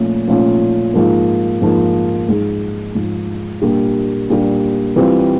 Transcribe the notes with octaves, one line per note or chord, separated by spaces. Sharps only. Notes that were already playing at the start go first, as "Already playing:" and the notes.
Already playing: A#2 F3 A3 C#4 F4
A#2 F3 A3 C#4 F4
G#2 F3 A#3
G#2 F3 A#3
G#2 F3 G#3
G#2 F3 G#3
A#2 G3 A#3 D4 G4
A#2 G3 A#3 D4 G4
E3 G3 C4 F4